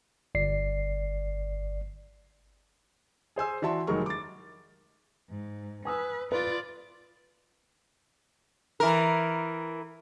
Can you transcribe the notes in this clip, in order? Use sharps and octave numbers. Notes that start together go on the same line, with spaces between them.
G1 D5 C7
G#4 C5 G#5 E6
E3 F#4 D5 E5 A5 C6
F1 D#3 F#3 G#3 A#4 C#6
D6 A6
G#2
B4 G#5 D#6 E6
F4 B4 D5
E3 A#4